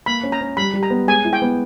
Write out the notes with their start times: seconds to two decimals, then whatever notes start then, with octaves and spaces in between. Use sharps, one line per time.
0.06 A#3 B5
0.23 C#4
0.32 A#5
0.41 C#4
0.57 G3 B5
0.74 G3
0.83 A#5
0.90 B3
1.08 G#3 G#5
1.25 E4
1.33 G5
1.42 B3